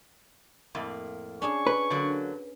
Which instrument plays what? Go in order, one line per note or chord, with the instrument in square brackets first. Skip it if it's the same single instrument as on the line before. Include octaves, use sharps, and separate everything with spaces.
[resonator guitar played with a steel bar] F2 A2 A#3
[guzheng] C#4 D4 G#4 [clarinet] C#6
[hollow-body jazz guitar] B4
[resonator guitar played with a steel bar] D3 F#3 A#3